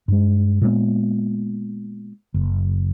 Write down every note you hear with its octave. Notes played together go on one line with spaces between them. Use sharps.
G2 G#3
A#2 G#3 A#3 B3
F#1